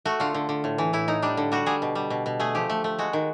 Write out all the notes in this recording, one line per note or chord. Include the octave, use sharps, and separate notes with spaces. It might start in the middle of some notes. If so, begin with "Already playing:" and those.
A3 F#4
D3 F4
D3
D3
A2
E3
A2 E4
A2 D#4
G3 D4
D3
G3 F#4
G3 G#4
B2
G3
B2
B2
A3 G#4
F3 G4
A3
A3
G#3 F#4
D#3